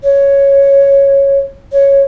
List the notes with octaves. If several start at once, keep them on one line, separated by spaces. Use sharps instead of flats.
C#5
C#5